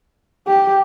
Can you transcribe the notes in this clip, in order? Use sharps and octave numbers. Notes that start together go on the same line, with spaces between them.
G4